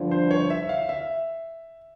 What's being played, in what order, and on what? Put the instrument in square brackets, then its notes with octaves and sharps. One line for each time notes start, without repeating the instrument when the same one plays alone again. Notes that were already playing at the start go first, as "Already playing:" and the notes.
Already playing: [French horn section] G2 D3 F3
[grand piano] C5
C#5
E5
F5
E5